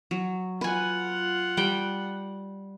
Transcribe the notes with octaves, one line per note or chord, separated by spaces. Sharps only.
F#3
F4 B4 F#5 G#5
G3 G5